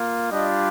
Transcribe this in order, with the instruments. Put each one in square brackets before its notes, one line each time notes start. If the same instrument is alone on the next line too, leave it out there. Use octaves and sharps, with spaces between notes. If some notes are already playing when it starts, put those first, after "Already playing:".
Already playing: [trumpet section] A#3 F4
G3 D4 F4 D#5